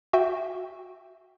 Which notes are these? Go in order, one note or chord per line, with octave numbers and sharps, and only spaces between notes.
F#4 E5 G5